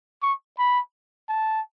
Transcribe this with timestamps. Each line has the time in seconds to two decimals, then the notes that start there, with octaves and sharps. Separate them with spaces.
0.22 C#6
0.58 B5
1.29 A5